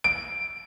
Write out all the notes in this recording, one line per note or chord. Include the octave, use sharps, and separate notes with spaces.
D7